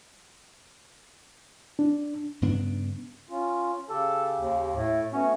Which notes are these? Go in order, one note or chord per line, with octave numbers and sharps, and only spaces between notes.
D4
G2 C#3 B3 D4
C#4 F4
C#3 G4 A4
D#2
A2 A3
A3 B3 C#4 F#4